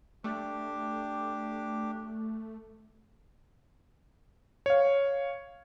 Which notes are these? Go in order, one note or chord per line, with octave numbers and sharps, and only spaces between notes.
A3 D4 G4
C#5 F5